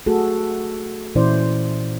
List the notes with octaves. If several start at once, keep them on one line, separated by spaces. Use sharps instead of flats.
A3 F#4 G#4 A4
A#2 E3 C#4 E4 C5 D5